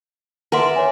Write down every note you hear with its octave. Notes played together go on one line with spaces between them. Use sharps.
A#4 B4 D5 E5 F#5 C6
C#5 G#5